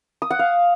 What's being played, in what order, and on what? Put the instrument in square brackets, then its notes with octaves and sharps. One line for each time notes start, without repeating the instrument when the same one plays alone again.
[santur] D#6
F#5
F5